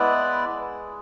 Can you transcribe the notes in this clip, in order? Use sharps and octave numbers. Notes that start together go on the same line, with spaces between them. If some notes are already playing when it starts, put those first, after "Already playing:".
Already playing: G#3 B3 E4 B4 D5